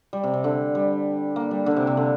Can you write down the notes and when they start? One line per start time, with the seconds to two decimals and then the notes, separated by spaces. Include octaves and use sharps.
0.13 G3
0.23 C3
0.34 C3
0.44 D3
0.75 G3
1.36 A#3
1.51 G3
1.66 D3
1.77 C3
1.87 C3
1.97 D3